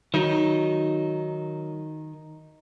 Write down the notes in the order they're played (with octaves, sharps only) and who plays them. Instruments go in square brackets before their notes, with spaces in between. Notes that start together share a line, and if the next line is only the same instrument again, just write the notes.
[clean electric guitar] D#3 [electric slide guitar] F#3 [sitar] D#4